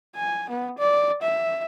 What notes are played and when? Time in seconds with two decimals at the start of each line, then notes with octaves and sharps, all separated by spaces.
0.15 G#5
0.50 B3
0.79 D5
1.22 E5